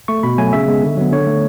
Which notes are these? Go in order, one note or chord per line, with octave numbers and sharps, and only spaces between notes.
A3 C#6
B2 B5
F#3 A3 G#5
C#3 E5
G#3 B3
D3
F#3 B3
D3 C#5
A3